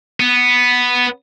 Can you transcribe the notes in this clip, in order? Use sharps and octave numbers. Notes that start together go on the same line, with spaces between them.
B3